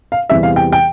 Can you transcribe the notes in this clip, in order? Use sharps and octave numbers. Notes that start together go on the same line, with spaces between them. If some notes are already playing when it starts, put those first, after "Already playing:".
F5
E2 C3 E3 G3 E5
F5
G5
G5